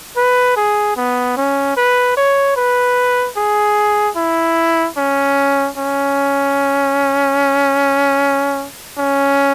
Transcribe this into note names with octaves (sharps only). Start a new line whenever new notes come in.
B4
G#4
B3
C#4
B4
C#5
B4
G#4
E4
C#4
C#4
C#4